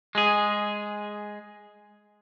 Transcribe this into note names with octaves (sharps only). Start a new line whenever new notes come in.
G#3 G#4